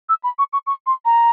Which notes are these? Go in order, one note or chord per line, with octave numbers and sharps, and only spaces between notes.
E6
B5
C#6
C#6
C#6
C6
A#5